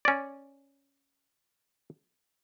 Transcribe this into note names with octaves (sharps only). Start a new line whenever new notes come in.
C#4 D5